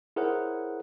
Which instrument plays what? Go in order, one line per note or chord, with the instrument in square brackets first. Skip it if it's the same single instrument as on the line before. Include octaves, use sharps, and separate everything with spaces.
[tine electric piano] E4 G#4 A#4 C5 C#5 F#5